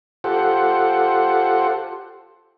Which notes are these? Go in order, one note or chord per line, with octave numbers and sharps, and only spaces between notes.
F4 G4 A4 C5 F#5